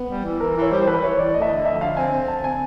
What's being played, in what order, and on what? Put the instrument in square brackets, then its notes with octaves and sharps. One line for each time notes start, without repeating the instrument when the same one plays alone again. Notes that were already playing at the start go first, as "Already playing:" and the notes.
Already playing: [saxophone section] B3
G3
E3
[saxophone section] E3 [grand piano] A#4
[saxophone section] E3
[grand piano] C#5
[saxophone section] G3 [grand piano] C5
[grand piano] C5
[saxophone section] E3 [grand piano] B4
[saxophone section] E3 [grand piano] C#5
[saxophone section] E3 [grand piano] D5
[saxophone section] A3 [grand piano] D#5
[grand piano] E5
[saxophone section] D3 [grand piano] D#5
[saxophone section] F3 [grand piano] E5
[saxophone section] D3 [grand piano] F5
[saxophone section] C4 [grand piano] G#5
[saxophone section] C4
[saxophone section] D3 [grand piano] A5
[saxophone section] C4 [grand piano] G#5